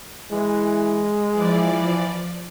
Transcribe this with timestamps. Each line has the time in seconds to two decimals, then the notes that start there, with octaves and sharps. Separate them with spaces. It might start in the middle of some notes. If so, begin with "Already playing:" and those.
0.31 E3 G#3
1.35 E3 F3 D5